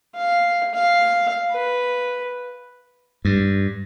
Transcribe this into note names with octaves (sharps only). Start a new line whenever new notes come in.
F5
F5
B4
G2